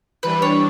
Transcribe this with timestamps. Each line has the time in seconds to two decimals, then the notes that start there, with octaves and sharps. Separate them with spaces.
0.23 E3 G3 D4 B4
0.42 C#5